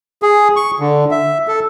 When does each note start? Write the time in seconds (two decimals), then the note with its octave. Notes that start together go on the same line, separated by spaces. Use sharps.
0.23 G#4
0.56 C#6
0.80 D3
1.11 E5
1.48 A4